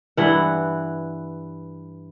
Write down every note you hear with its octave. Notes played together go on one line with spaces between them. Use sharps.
G2 E3 F#5